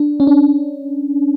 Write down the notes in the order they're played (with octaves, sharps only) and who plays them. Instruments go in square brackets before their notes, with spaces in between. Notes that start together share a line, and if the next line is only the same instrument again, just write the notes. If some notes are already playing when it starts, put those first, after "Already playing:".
Already playing: [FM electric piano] D4
C#4
D4